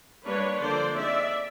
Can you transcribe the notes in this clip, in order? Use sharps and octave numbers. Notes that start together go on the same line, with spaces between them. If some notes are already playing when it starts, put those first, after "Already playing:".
G3 A#3 D4 B4 C#5
D3 F3 A#3 D4 C5 D5
G#3 C4 D#4 D5 E5